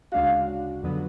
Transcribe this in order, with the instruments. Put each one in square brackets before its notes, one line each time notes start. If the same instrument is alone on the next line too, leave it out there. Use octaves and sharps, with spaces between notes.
[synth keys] D2 C#3 G#3 D4 F#4 [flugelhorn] F5
[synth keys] F2 D3 F#3 B3 F#4